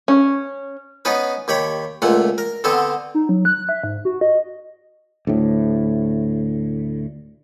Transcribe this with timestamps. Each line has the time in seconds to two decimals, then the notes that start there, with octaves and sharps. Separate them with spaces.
0.08 C#4
1.05 B3 C#4 D#4 B4
1.48 D#2 G4 C#5 B5
2.02 C#2 A#2 A3 F#5
2.38 A#4
2.64 D3 B3 C4 A4
3.14 D#4
3.29 F#3
3.45 F#6
3.69 E5
3.83 G#2
4.05 F#4
4.21 D#5
5.27 D2 A2